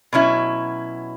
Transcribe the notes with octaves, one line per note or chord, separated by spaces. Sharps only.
B2 F#3 C#4 E4